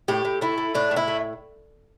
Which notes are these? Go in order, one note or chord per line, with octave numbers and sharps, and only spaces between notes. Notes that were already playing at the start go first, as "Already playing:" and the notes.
A2 G4
A2
A3 E4
A3
A2 D4
A2
E4
A3